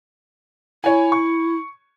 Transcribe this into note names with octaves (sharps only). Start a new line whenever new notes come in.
E4 C#5 G#5
C#6